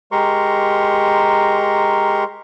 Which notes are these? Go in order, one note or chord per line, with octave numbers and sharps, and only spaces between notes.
G#3 G4 A#4 A#5 C6 C#6